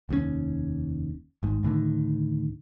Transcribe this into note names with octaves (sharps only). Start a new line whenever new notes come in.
F1 D#2 A2 C#4
G#1 G#2
D2 A2 D3 D#3